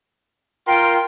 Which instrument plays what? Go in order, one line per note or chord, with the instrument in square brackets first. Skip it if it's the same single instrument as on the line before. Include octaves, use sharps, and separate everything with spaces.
[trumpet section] F4 A#4 C6 [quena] G5